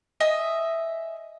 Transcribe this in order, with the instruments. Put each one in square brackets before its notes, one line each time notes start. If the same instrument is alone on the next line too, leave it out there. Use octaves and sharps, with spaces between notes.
[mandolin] D#5 E5 G#5 D#6